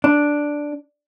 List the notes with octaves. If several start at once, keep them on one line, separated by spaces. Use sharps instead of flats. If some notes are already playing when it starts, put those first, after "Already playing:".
D4